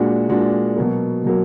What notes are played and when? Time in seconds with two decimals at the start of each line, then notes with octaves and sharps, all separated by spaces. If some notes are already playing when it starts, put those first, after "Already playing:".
Already playing: A#2 G#3 D4 F#4
0.29 A#2 G#3 D4 F#4
0.76 B2 F#3 A#3
1.24 B2 F#3 A#3